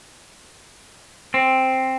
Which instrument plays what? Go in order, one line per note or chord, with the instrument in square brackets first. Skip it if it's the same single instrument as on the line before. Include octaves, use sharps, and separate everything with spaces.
[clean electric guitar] C4